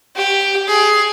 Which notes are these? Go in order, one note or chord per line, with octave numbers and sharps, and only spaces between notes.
G4
G#4